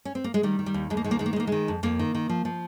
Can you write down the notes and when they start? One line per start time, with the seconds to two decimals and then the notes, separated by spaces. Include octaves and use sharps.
0.05 C#4
0.15 C4
0.24 A#3
0.34 G#3
0.43 D#3 G3
0.59 D#3
0.66 G3
0.74 D#2
0.90 D#2 G#3
0.97 A#3
1.04 D#3 G#3
1.11 A#3
1.19 D#3 G#3
1.26 A#3
1.33 G#3
1.36 D#3 A#3
1.47 D#3 G#3
1.68 F2
1.83 F2 A#3
1.99 D#3
2.15 D#3
2.29 F3
2.45 F3